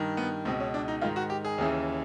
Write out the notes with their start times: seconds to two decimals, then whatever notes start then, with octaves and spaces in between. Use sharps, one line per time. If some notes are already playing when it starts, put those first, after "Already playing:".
Already playing: G2 D#3
0.17 B3
0.45 C#2 B2 C4
0.60 C#4
0.74 D4
0.88 D#4
1.01 G#2 D#3 F4
1.16 F#4
1.30 G4
1.45 G#4
1.58 D#2 C#3 E3